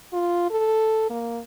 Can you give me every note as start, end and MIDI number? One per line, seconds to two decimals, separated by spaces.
0.13 0.50 65
0.51 1.07 69
1.10 1.40 58